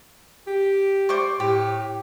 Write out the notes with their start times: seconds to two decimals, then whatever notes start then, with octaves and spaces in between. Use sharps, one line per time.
0.47 G4
1.09 C5 D5 C#6
1.40 A2 G4